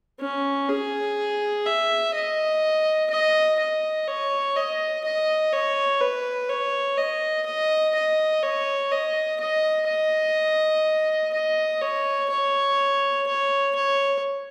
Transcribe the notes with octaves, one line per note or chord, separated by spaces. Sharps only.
C#4
G#4
E5
D#5
D#5
D#5
C#5
D#5
D#5
C#5
B4
C#5
D#5
D#5
D#5
C#5
D#5
D#5
D#5
D#5
C#5
C#5
C#5
C#5